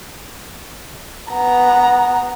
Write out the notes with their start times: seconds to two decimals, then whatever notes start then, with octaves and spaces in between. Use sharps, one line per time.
1.30 B3 A#5